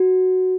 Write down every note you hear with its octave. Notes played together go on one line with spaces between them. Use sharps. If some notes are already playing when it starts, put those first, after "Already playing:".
Already playing: F#4